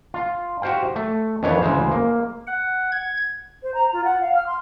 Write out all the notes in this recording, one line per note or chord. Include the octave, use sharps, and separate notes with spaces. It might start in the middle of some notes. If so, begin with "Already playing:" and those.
F4
F#4 G4 C5 F5 G5
A3
F2 D#3 E3 D4 B4 C#5
D2 C#3 E3 G#3 C5
A#3
F#5
G#6
C5
A#5
F4
F#5
F5
F6
C6